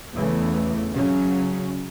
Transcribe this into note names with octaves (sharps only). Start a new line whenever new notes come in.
E2 C#3 E3 A3
C#3 F#3 C#4